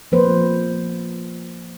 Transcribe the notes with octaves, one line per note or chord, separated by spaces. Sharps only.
F3 A#3 B4 C5